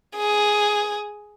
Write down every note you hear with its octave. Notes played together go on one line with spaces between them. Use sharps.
G#4